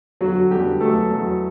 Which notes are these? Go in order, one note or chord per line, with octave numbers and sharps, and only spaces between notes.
E2 D3 F#3 F#4
E2 D3 F#3 G3 G4
E2 B2 F#3 A3 A4
E2 B2 F#3